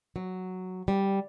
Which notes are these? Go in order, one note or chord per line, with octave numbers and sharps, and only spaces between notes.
F#3
G3